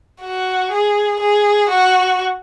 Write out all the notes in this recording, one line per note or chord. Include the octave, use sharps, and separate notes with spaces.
F#4
G#4
G#4
F#4